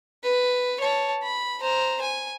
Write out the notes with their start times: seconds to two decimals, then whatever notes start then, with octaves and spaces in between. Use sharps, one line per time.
0.23 B4
0.80 C#5 A5
1.23 B5
1.62 C5 A#5
2.01 G#5